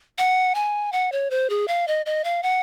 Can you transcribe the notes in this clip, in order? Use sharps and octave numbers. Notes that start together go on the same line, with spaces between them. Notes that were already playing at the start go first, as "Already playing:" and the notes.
F#5
G#5
F#5
C#5
C5
G#4
F5
D#5
D#5
F5
F#5